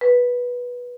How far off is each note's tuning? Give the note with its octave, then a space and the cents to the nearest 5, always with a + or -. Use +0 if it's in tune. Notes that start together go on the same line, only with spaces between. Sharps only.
B4 -15